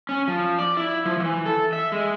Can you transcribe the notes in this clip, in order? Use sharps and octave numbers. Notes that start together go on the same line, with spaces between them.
C#4
F3
D5
E4
F3
E3
A4
E5
G#3